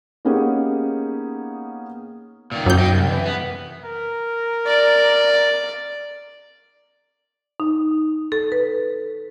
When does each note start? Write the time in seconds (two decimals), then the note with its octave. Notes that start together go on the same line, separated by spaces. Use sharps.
0.25 A#3 B3 C#4 D#4 G4 G#4
2.52 A#2 D#3
2.66 F#2 G6
2.79 D#5 G5
2.92 C2
3.09 E3
3.26 B3
3.85 A#4
4.66 D5
7.60 D#4
8.32 A4
8.52 B4